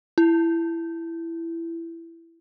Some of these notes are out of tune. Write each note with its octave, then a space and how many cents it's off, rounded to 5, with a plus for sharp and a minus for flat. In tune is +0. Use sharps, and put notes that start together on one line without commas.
E4 +15